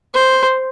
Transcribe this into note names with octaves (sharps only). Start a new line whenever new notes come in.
C5